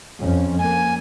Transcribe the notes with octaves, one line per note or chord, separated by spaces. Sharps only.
F2 C#4
A#3 G#5